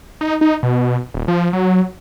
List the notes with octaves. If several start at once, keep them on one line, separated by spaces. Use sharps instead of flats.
D#4
D#4
B2
D#1
F3
F#3